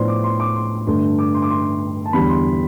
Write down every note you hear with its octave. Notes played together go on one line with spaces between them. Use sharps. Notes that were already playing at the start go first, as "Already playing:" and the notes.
Already playing: A2 F3 B3 D4 C5 D5 C6
D6
C6
D6
C6
G2 D3 A3 C6
D6
C6
D6
C6
A5
E2 D3 G3 B5
C6